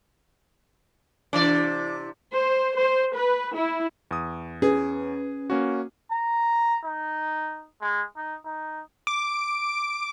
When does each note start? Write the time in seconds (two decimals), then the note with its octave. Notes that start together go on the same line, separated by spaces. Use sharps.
1.33 C3 E3 D4 D5
2.32 C5
2.75 C5
3.14 B4
3.54 E4
4.11 E2 D#6
4.62 C#4 G#4 B4
5.50 A#3 C#4 F#4
6.11 A#5
6.85 D#4
7.82 G#3
8.17 D#4
8.46 D#4
9.07 D6